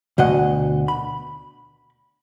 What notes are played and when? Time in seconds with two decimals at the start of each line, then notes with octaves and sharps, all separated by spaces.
0.18 D2 B2 D#5 F#5
0.88 B5